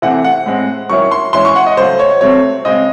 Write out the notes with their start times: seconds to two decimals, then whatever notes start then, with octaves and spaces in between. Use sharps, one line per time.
0.02 C3 E3 A3 C4 E4 F#5
0.24 F#5
0.46 A2 G#3 C4
0.90 D#3 F#3 C#4 E4 C#6
1.11 C6
1.33 G#2 E3 G#3 C#4 E4 C6
1.45 C#6
1.56 F#5
1.67 D#5
1.77 C#3 F#3 A3 C5
1.99 C#5
2.21 C3 F#3 A3 C4 C#5
2.65 C#3 G#3 C4 D#5